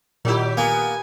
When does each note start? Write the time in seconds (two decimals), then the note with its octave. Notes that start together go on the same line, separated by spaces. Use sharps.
0.25 A#2 D#3 F#3 E4 G4
0.57 A#3 B3 G#5